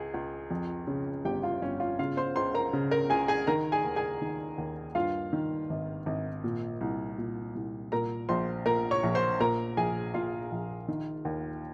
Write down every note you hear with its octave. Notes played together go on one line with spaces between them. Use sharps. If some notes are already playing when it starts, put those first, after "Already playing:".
Already playing: C#2 G#4
C#2
F2
C#3
G1 G4 G5
F4 F5
G1 C#4 C#5
F4 F5
C#3 F4 F5
C5 C6
C#2 C5 C6
A#4 A#5
C#3
A#4 A#5
C#2 G#4 G#5
G#4 G#5
D#3 A#4 A#5
G#4 G#5
D#2
G#4 G#5
D#3
D#2
G2 F4 F5
D#3
G#1
G#1
A#2
C2
A#2
C2
A#2 A#4 A#5
A#1 C5 C6
A#2 A#4 A#5
C#5 C#6
A#1
C5 C6
A#2 A#4 A#5
A#1 G#4 G#5
A#2 F4 F5
A#1
D#3
D#2